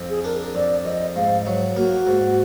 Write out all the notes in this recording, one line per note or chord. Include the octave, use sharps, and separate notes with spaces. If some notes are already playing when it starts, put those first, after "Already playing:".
Already playing: F2
G#4
D4 A#4
F2 D5
F2 D#5
G#2 F5
F#3
A#3 F#4
G#2